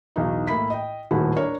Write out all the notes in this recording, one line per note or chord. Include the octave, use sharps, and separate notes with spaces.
B1 E2 D#4
A2 A#3 E4 B5 B6
D#5 G5
D#1 D#2 A2 F#4 G#4 B5
D4 A#4 C#5